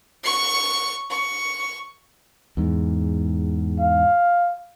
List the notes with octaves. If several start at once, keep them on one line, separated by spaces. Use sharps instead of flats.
C#6 C#7
C#6
E2 G#2
F5